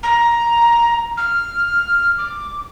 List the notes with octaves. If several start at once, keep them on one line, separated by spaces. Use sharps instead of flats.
A#5
F6
D6